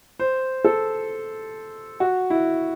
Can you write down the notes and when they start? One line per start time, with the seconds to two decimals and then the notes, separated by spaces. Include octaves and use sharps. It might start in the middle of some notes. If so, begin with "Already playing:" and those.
0.20 C5
0.65 A4
2.00 F#4
2.30 E4